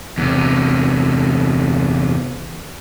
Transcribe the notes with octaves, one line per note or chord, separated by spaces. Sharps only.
E2 C3